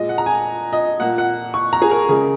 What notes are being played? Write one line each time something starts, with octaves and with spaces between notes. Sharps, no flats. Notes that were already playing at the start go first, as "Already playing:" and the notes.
Already playing: A#2 G#3 D#5
F#5
A#5
G#5
D#5
A#2 A#3 F#5
F#5
C#6
A#5
G#4
A#4
C#3 G#3